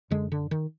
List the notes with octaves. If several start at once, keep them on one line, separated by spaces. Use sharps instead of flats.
F#2 D3 G#3
D3
D#3